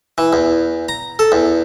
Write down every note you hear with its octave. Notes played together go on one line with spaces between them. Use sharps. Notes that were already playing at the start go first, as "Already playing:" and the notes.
E3
E2
A#5
A4
E2